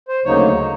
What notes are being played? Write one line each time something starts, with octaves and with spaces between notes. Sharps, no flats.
C5
D2 C#3 F#3 A#3 D#4 C#5
C#5